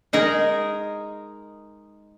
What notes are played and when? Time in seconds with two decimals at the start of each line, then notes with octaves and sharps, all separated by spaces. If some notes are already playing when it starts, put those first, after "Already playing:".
0.13 G#3 D#4 G#4 A#4